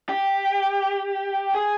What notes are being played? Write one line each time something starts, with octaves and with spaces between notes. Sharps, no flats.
G4
G#4